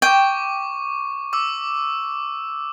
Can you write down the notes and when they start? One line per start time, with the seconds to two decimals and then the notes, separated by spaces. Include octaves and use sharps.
0.02 G5 C#6 D6
1.33 D6 E6